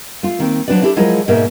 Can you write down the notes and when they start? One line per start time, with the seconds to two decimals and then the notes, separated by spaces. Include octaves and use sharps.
0.23 A3 F4
0.39 D#3 A#3 C4
0.68 F3 F#3 D4 F#4 B4 D5
0.82 D4 E4 G4 A4
0.96 F3 F#3 G#3 E4 F4 A#4
1.28 G#2 B2 A#3 D#4 A#4 E5